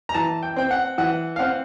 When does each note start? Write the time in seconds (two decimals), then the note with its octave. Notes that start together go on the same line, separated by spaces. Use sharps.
0.09 A#5
0.14 E3 A5
0.43 G5
0.56 C4 G5
0.71 F#5
0.98 E3 F#5
1.36 F5
1.39 C4 F#5